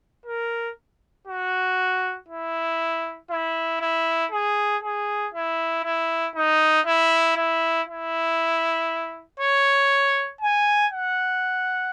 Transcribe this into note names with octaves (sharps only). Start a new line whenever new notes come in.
A#4
F#4
E4
E4
E4
G#4
G#4
E4
E4
D#4
E4
E4
E4
C#5
G#5
F#5